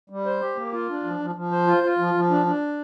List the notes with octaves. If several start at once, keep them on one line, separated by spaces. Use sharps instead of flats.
G3
C5
G4
A#3
F4
D4
F3
F3
F3
C5
F4
F4
F3
F3
D4
D4